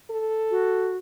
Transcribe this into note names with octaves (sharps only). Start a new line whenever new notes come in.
A4
F#4